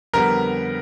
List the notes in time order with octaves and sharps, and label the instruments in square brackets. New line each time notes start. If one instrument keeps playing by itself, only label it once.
[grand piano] F2 D3 G3 B3 A#4 A#5